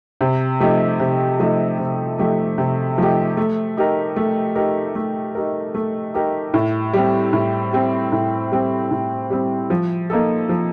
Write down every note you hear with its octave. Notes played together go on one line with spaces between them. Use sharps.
C3
F3 A3 D#4 G4
C3
F3 A3 D#4 G4
C3
F3 A3 D#4 G4
C3
F3 A3 D#4 G4
A3
D#4 G4 A#4
A3
D#4 G4 A#4
A3
D#4 G4 A#4
A3
D#4 G4 A#4
A2
G3 C4
A2
G3 C4
A2
G3 C4
A2
G3 C4
F3
A#3 D#4 A4
F3